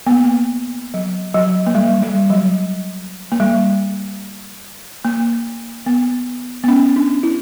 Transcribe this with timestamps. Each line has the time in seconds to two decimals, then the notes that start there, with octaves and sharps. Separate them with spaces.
0.07 B3
0.11 A#3
0.94 F#3
1.34 F#3
1.67 A#3
1.75 G3
2.02 G3
2.30 F#3
3.32 A#3
3.40 G3
5.05 A#3
5.86 B3
6.64 B3
6.68 C#4
6.96 D4
7.23 E4